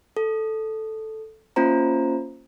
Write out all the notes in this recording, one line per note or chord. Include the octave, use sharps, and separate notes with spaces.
A4
A#3 C#4 F4 C5 A#5